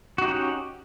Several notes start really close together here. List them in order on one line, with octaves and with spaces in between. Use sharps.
F#4 D#4 G4 C#4